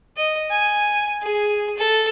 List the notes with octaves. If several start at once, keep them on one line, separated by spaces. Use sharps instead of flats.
D#5
G#5
G#4
A4